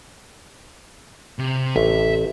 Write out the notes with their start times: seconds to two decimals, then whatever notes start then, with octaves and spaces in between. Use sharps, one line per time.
1.39 C3
1.76 A1 E5